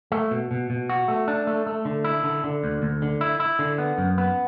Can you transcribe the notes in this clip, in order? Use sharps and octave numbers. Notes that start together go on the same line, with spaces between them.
A3
B2
B2
B2
F#4
A3
D4
A3
A3
D3
E4
D3
D3
D2
D2
D3
E4
E4
D3
B3
F#2
B3